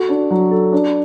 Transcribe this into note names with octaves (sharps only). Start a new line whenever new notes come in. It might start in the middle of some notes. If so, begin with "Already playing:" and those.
Already playing: F#4 A4
D4
F#3
A4
D4